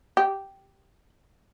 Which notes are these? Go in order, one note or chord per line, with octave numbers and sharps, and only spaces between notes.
G4